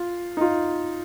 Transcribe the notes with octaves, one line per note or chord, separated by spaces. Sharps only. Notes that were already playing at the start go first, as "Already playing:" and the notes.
Already playing: F4
D#4
F4